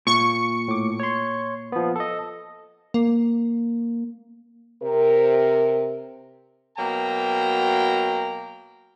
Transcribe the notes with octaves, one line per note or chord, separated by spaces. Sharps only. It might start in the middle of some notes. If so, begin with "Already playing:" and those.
A#2 C#6 C#7
A2 D6
C#5 C6
F3 B3
A4 D#5
A#3
C3 A#4
B2 F#3 A#3 G5 A#5